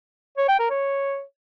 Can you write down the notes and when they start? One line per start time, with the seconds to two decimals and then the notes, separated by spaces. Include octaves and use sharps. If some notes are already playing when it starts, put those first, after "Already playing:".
0.38 C#5
0.48 G5
0.59 A#4
0.70 C#5